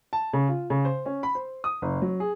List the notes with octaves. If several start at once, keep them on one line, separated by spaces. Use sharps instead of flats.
A5
C#3
F4
C#3
C5
C#4
B5
C5
D#6
F#1
F#3
G#4